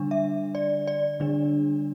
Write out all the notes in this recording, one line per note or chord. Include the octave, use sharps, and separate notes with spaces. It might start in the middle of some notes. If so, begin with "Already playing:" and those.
Already playing: D3 G3 D4
E5
D5
D5
D3 G3 D4